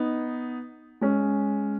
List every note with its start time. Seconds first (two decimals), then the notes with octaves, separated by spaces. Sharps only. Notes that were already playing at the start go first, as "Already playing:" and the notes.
Already playing: B3 D#4
1.01 G#3 C#4